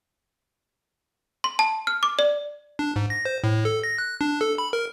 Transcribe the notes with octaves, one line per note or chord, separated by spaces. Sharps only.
C6
A5
F6
D6
D5
D4
G#2
A#6
C5
A2
A4
A#6
F#6
D4
A4
B5
A#4